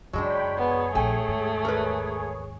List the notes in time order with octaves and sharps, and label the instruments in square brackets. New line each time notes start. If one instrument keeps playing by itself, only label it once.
[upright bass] F#2 C#3 [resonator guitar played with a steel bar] F#3 G#3 D4 [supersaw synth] C#5 G5 B5
[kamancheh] B3 [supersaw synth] G#4 C#5
[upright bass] A#1 [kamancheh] A3 [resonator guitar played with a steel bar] G5 G#5
[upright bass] D#2 G#2
[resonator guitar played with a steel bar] A#4 B4